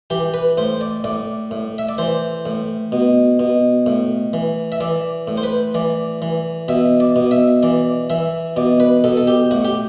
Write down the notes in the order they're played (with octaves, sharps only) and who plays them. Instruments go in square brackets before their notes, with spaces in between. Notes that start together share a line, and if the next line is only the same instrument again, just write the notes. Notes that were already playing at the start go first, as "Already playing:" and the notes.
[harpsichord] E3 G4
B4
A2 C5
D5
A2 D5
A2
E5
D5
E3 C5
A2
B2
B2
A2
E3
E5
E3 D5
A2
C5
B4
E3 D5
E3
B2 E5
D5
B2
E5
E3 D5
E3 E5
B2 D5
B4
B2 A4
A4
G4
A2 F#4
G4